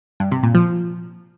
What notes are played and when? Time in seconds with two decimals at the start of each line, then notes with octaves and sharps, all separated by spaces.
0.20 G2
0.32 C3
0.43 A#2
0.55 F3